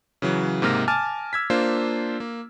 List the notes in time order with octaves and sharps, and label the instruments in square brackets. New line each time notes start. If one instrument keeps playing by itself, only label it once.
[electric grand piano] C#3 E3 F#3
G#2 C3 A#3 F6 A#6
G#5 A5 D6 F6 A6
E6 G#6 B6
A#3 D4 F4 C5
A#3